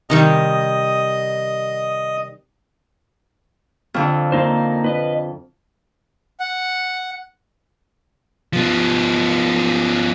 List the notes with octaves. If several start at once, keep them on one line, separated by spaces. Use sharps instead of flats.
C3 D#3 G3 D#5
F2 D3
A#3 D#4 C5
B4 D#5
F#5
F3 B3